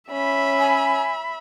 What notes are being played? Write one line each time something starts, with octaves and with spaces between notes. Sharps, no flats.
C#4 E5 B5
G#5